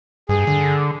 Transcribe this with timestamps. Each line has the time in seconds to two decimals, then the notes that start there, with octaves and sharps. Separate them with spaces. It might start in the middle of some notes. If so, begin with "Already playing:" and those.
0.29 G2 G#4
0.47 D3